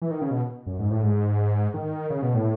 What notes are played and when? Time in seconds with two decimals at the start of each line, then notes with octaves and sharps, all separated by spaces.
0.02 E3
0.11 D#3
0.21 C#3
0.31 B2
0.66 F#2
0.79 G#2
0.91 A2
1.03 G#2
1.74 D#3
2.10 C#3
2.22 B2
2.35 A2